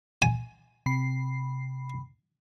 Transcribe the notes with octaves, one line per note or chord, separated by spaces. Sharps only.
G#5
C3 B5 C7